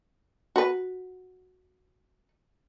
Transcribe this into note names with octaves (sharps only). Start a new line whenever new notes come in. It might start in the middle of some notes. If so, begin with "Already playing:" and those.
F#4 B4